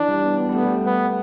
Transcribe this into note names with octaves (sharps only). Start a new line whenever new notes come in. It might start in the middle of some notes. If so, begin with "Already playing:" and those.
Already playing: E3 D4
G3
B3
B3
G3
A3 B3
G3
A3
B3